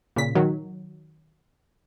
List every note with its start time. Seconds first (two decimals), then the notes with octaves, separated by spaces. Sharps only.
0.16 A#2 C#3 B6
0.35 D#3 F#3